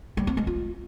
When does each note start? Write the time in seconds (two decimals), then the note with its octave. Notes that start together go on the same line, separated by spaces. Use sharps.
0.17 G3
0.27 C4
0.37 G#3
0.47 F4